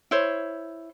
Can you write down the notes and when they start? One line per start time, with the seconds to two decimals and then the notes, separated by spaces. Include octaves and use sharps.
0.11 E4 C5 C#5